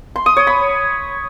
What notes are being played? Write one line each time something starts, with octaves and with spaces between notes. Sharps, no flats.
C6
D#6
C#5
B5